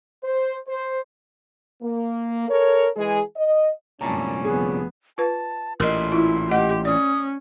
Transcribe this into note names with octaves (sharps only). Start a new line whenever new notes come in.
C5
C5
A#3
A4 A#4 C#5
E3 G#3 G#4
D#5
C2 F#2 A#2 D3 A3 C#4 A5 A#5
F1 B3 G#4
F4 B4 A5
A1 A#2 A#4 D#5 C6
E4 F4
A3 G4 D#5 F#5
C#4 D5 D#6